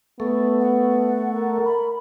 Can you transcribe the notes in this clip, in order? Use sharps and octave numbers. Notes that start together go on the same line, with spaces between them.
A3 B3
F#5
A#4
B5